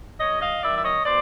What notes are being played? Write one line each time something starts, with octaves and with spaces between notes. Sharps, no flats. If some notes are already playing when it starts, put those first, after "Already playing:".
G2 C#5 D#5
D#5 F5
D#3 F#3 D5 E5
E5
C#5 D#5
B2 C5 D5